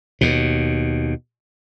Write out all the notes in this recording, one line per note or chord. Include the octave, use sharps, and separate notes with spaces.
D#2 B2